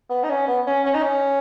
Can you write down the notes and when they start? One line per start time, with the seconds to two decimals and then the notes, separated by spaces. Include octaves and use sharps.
0.10 B3
0.23 D#4
0.30 C#4
0.48 B3
0.67 C#4
0.85 C#4
0.94 D#4
1.02 C#4